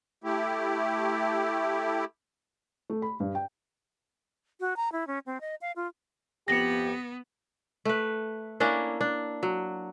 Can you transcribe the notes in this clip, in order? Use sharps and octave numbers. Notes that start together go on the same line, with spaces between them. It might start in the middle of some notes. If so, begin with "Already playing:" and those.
A3 E4 G4
A3
B5
G2
G5
F#4
A#5
E4
C#4
C4
D#5
F5
F4
F2 B3 G4 A#6 C#7
A3 B4
A#3 C#4 D4 E4
D4
F#3